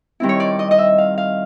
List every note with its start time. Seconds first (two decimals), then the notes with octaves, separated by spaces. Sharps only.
0.20 D#3 G3 C4 E4
0.29 C#5
0.40 D5
0.59 D#5
0.71 D#5
0.78 E5
0.98 F5
1.18 F5